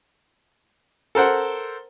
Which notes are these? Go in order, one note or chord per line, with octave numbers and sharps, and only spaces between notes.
A4 A#4 C5 F#5